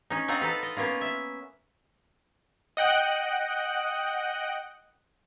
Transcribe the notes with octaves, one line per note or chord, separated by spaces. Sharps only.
C#4 D#4
C4 D#4 F4 F#5 A#5
D#4 A4 B4
D#5
A#3 B3 C#4 F4
E5
D#5 F#5 G5 F#6